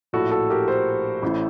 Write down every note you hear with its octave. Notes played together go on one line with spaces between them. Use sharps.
A#1 A2 F#4 A4
F#4 A4
G4 A#4
A4 C5
A1 A2